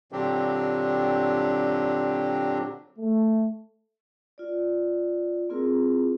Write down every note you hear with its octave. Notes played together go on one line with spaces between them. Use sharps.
A#2 D3 F#3 C4 D4 G4
A3
F4 D5
A#3 C4 E4 F4 G#4 A#4